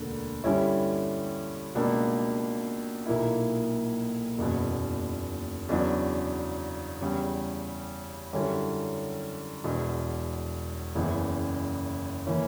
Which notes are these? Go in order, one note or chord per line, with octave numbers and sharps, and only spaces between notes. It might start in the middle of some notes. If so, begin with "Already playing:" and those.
Already playing: E1 D2 D3 A#3
G2 D3 G3 C#4 E4
C#2 B2 A#3 D4
B1 A#2 A#3 E4
F#1 E2 B2
E2 C#3 F#3 B3 D4
E2 C#3 G3
F#2 D3 G3 C#4 E4
E1 E2 B2
F#1 E2 C#3 E3
C#3 E3 A#3 C#4